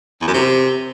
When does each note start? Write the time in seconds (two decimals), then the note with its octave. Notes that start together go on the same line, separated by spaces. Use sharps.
0.21 E2
0.27 F#2
0.34 C3